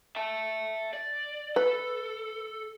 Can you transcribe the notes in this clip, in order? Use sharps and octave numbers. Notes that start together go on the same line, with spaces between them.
E5 A5
D5
A4 B4